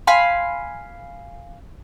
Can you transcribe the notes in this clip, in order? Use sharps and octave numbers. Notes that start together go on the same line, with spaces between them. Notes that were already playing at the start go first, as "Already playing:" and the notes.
F5 G#5 B5 C6